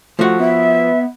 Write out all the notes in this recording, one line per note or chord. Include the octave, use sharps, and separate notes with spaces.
F3 A3 F#4
B3 E5